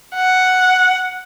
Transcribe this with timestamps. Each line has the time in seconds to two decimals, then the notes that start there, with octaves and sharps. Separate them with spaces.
0.15 F#5